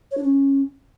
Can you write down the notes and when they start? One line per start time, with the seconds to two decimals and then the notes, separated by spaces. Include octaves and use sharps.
0.11 C#5
0.17 D4
0.23 C#4